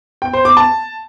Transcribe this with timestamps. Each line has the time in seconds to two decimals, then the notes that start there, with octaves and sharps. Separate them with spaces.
0.22 G5
0.33 C5
0.45 D6
0.57 A5